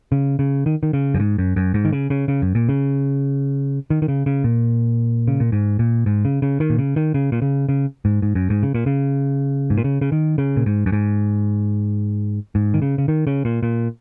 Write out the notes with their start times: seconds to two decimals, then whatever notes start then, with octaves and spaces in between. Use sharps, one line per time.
0.12 C#3
0.39 C#3
0.66 D#3
0.83 D#3
0.93 C#3
1.14 F#2
1.20 G#2
1.38 F#2
1.56 F#2
1.74 G#2
1.85 D#3
1.92 C#3
2.10 C#3
2.28 C#3
2.42 F#2
2.55 A#2
2.69 C#3
3.90 D#3
4.02 D#3
4.08 C#3
4.26 C#3
4.44 A#2
5.28 C#3
5.40 A#2
5.52 G#2
5.79 A#2
6.06 G#2
6.25 C#3
6.42 C#3
6.60 D#3
6.70 A#2
6.79 C#3
6.96 D#3
7.14 C#3
7.32 A#2
7.42 C#3
7.69 C#3
8.05 G#2
8.22 G#2
8.35 F#2
8.50 G#2
8.63 C#3
8.74 A#2
8.86 C#3
9.70 G#2
9.77 A#2
9.84 C#3
10.01 C#3
10.12 D#3
10.38 C#3
10.57 A#2
10.66 G#2
10.86 F#2
10.92 G#2
12.55 G#2
12.74 D#3
12.82 C#3
12.98 C#3
13.08 D#3
13.27 C#3
13.45 A#2
13.63 A#2